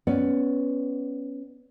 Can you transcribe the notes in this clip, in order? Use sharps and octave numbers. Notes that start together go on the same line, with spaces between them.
B3 C#4 D5